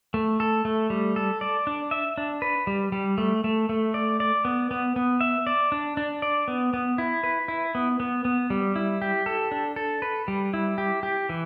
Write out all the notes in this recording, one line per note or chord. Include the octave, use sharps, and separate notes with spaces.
A3
A4
A3
G3
A4
D5
D4
E5
D4
B4
G3
G3
A3
A3
A3
D5
D5
B3
B3
B3
E5
D5
D4
D4
D5
B3
B3
E4
B4
E4
B3
B3
B3
G3
E4
G4
A4
D4
A4
B4
G3
E4
G4
G4
E3